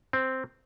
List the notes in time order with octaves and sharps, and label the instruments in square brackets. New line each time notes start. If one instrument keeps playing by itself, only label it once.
[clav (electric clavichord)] C4